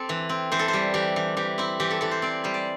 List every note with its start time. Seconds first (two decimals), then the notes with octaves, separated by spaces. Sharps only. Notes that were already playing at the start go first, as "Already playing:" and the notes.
Already playing: C4 G4 A4
0.09 E3
0.29 C4
0.52 E3 C5
0.59 A4
0.68 C5
0.73 G3
0.94 E3 G4
1.16 E3
1.37 E3 G4
1.58 C4 E4
1.80 E3 G4
1.91 A4
2.01 E3 A4
2.11 C5
2.22 C4 D5
2.44 G3 C5
2.54 D5